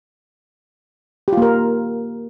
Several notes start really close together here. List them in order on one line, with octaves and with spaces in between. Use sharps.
G4 F4 A#3 A#4